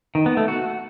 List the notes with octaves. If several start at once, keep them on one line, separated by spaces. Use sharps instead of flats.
D#3
B3
A3
F#4